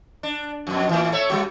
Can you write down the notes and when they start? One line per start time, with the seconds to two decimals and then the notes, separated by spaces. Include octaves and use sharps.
0.23 D4
0.67 F2 B2
0.89 A2 E3
1.12 A3 C#5 E5
1.30 G3 G#3 F#4